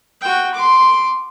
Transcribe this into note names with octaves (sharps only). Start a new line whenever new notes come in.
F#4 G5
C6 D6